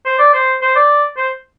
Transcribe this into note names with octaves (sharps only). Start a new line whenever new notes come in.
C5
D5
C5
C5
D5
C5